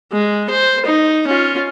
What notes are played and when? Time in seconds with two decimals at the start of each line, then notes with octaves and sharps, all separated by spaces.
0.12 G#3
0.50 C5
0.86 D#4
1.27 C#4 F4